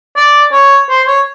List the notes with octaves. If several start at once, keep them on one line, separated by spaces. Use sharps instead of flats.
D5
C#5
C5
C#5